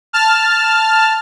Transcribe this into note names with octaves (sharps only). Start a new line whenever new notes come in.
A5 F6